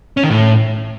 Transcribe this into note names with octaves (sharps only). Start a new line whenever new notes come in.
C#4
D#3
A2